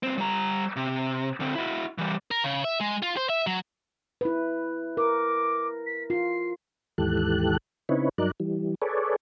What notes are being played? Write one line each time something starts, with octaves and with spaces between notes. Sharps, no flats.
G2 C4
G3 A#5
C3
D3 C4
E4 F#4
E3 G3
A#4
C#3
E5
G#3
F4
C5
E5
F#3
E4 B4
A#4 D6
B6
F4 C7
D#2 G#2 E3 G4 A4 F#6
C#3 C4 D#4 E4 B4 C#5
G2 F#3 D#4 A#4 D5 F#6
E3 G3
G#4 A4 B4 C#5 D5